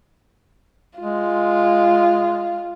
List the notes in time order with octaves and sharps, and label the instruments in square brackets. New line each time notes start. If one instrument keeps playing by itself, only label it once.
[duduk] G#3 [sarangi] F4